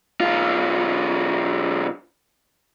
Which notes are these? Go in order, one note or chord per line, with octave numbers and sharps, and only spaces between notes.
B1 F4